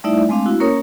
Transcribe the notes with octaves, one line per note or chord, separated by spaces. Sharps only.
G3 A3 D#4 E4 D5 E5
G#3 A3 C4 D4 F5
E4 F#4
A#3 C#4 A#4 C#5 D#6